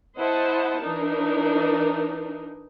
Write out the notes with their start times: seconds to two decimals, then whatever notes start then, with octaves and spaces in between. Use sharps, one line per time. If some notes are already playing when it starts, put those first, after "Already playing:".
0.17 E4 C5 D#5 F#5 A5
0.81 E3 D4 D#4 A#4